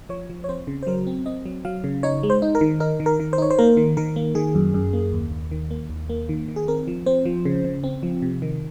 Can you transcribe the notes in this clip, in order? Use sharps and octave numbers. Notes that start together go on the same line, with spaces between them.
F3 C#5
F3
C#5
C4 C5
C#3
C5
F#3 A#4
C4
C4 D#5
F#3
F#3 F5
C#3
D#4 C#5
G#3
C5
D#4
A#4
D#3
D#4 A#4
D#3
A#4
D#3
C5
D#4 C#5
C5
A#3 A#4
D#3
D#3 A#4
A#3
D#3 G#4
F#2
F#2
A#3
D#2
D#2
D#3
A#3
D#2
A#3
D#3
D#3
G#4
C4 A#4
F3
C4 C5
F3
C#3
C#3
C4
F3
C3
D#3